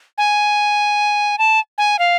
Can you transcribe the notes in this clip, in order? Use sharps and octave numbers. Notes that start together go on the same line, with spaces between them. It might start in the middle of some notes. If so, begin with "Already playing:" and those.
G#5
A5
G#5
F5